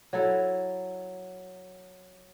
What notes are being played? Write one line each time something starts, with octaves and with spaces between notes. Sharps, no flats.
F#3 E4 A4